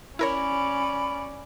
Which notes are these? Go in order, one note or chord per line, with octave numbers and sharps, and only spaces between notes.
C#4 E4 A#4 C#5 D5 B5